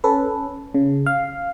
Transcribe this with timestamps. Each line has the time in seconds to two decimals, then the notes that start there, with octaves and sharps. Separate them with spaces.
0.04 C#4 A4 B4
0.74 C#3
1.06 F5